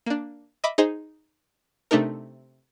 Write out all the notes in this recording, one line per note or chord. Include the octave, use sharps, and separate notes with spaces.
A#3 D4
D#5 E5 B5 D6
D#4 G#4 C5 D#5
C3 A3 D4 D#4 A#4